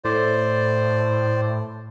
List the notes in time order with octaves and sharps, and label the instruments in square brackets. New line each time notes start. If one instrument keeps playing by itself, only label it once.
[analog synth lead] A2 [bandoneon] C5 D5